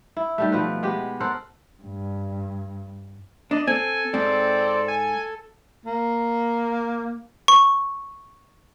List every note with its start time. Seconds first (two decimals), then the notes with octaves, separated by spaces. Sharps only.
0.17 E4
0.38 D#3 G3 A3
0.52 B2 F3 C4 B4
0.83 G#3 B3 G4
1.20 A4 A#4 C5 F#5
1.82 G2
3.51 D4 D5 D#5
3.67 C4 A4 G#5
4.14 G#2 C4 D5
4.88 G#5
5.86 A#3
7.48 C#6